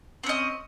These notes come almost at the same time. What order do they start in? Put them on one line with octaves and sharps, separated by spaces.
C4 C#4 D#5